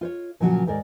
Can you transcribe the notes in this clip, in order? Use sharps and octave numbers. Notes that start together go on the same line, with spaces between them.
F4 C5 C#5
A#2 C#3 F3 F#3 A#3 F#4
D#2 G#2 A#4 D5